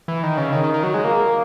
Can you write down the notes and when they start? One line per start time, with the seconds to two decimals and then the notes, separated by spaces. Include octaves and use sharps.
0.08 E3
0.23 D#3
0.37 C#3
0.52 D#3
0.63 D#3
0.74 D#3
0.83 F#3
0.94 G#3
1.04 A#3